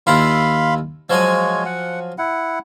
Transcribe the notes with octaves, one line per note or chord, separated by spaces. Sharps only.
D#2 E4 F4 F5 B5 C6
F3 F#3 G#3 C#5 G#5
F#5
E4 F#5